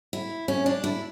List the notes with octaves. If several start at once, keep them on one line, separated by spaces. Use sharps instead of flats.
E4
C#4
D4
E4